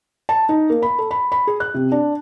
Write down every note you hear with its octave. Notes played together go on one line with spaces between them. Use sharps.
A5
D#4
A#3
B5
A4
B5
B5
G#4
F#6
C3
D4